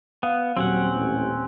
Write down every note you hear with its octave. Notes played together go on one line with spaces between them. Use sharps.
B3 F5
D#1 F#3 C4 C#4 F#5
A1